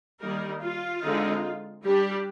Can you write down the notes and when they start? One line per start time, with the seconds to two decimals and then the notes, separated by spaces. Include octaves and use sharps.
0.19 D#3 G3 A#3 D#4 A#4
0.61 F4
1.01 D3 G#3 C4 D#4
1.84 G3 D4 G4